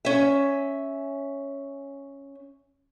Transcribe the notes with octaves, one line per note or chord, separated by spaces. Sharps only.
C#4 E5